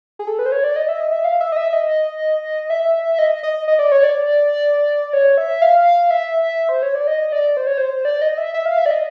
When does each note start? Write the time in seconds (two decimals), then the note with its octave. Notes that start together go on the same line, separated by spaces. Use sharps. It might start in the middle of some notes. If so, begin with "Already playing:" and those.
0.19 G#4
0.27 A4
0.39 B4
0.46 C5
0.52 C#5
0.64 D5
0.76 D#5
0.89 E5
1.01 D#5
1.12 E5
1.24 F5
1.41 E5
1.52 D#5
1.57 E5
1.73 D#5
2.70 E5
3.19 D#5
3.43 D#5
3.68 D#5
3.79 D5
3.92 C#5
4.03 D5
5.13 C#5
5.38 E5
5.62 F5
6.11 E5
6.69 C5
6.83 C#5
6.95 D5
7.07 D#5
7.32 D5
7.57 C5
7.67 C#5
7.78 C5
8.05 D5
8.22 D#5
8.38 E5
8.54 E5
8.65 F5
8.78 E5
8.86 D5
8.90 D#5